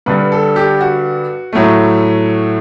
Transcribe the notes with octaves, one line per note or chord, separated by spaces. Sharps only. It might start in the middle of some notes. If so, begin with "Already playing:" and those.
G2 D3 G3 B4
A4
G4
F#4
A2 F#3 A3